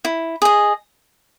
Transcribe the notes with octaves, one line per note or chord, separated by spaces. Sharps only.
E4
G#4 D#5